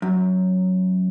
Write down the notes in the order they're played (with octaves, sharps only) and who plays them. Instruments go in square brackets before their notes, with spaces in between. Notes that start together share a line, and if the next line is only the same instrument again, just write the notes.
[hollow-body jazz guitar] F#2